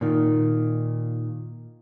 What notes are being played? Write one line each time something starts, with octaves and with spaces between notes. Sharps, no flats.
A#2 D#3